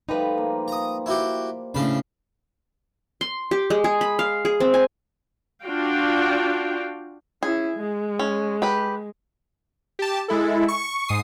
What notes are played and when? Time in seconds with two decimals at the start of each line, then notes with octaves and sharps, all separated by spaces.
0.09 F3 G3 A3 D#4 B4
0.38 A#3
0.68 A#5 D#6
1.06 E4 F#4 G4
1.74 A2 C#3 D4 F5 B5
3.21 C6
3.51 G4
3.70 G#3
3.84 G#4
4.01 B5
4.19 F5
4.45 G#4
4.60 C4
4.74 G#5
5.63 D4 F4 F#4 F5 G5
7.43 C#4 E4 G#4
7.76 G#3
8.19 C#4
8.62 G4 B4
9.99 G4 A5
10.28 G#3 E4 A4
10.68 C#6
11.08 G#2 D#6 C7